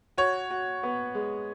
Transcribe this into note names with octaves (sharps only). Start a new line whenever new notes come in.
F#4 C#5
F#4
B3
G#3